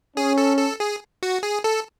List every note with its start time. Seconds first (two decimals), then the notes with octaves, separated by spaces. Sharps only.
0.17 C#4 G#4
0.38 A4
0.58 A4
0.80 G#4
1.23 F#4
1.43 G#4
1.64 A4